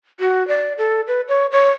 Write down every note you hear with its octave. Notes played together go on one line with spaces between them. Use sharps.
F#4
D5
A4
B4
C#5
C#5